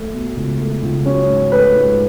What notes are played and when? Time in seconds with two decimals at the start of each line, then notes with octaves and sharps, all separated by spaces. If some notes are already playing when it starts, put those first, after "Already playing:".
Already playing: A3
0.13 B2
0.37 C#2
0.59 A3
0.83 C#2
1.05 F#3 C#4
1.29 G#2
1.52 A3 B4
1.75 G#2